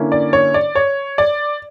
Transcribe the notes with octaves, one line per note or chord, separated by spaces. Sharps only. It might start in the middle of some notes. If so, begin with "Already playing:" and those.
Already playing: D3 A#3 C#4 E4
D5
C#5
D5
C#5
D5